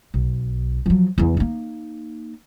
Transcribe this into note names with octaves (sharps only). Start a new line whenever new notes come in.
B1
F3 F#3
E2 E3
A#3 D#4